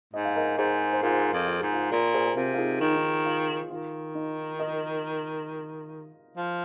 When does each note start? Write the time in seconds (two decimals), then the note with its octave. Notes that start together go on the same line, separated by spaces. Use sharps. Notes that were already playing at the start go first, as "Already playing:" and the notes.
0.13 G#2 D#5
0.25 F5
0.36 A#4 D#5
0.58 G#2 G#4 C5
0.93 C5
1.03 G#2 F4 A#4
1.33 F2
1.48 F4
1.60 G#2 G#4
1.74 F4
1.92 A#2 F4 A#4
2.14 G#4 C5
2.26 G#4
2.36 C3 F4 A#4
2.54 F4
2.58 D#4 G#4
2.81 D#3 D#4
2.96 D#4
3.26 F4
3.70 D#3 F4
4.15 D#4
4.59 A#4 D#5
6.37 F3